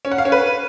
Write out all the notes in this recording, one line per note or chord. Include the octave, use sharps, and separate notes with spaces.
C#4
F#5
F5
C#4
B4